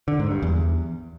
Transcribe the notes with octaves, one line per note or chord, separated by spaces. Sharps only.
D3
G#2
G2
E2